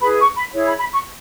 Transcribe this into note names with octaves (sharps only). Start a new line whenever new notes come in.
E4 G#4 B4 B5
C#6
B5
E4 G#4 C#5
B5
B5
C#6